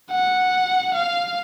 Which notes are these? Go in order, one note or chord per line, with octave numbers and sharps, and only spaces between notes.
F#5
F5